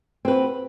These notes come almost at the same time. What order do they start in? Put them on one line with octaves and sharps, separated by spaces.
C4 B4 F#4